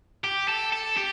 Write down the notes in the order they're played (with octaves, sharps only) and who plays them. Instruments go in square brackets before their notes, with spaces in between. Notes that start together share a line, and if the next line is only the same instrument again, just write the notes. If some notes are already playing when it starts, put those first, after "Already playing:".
[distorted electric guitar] G4
A4
A4
G4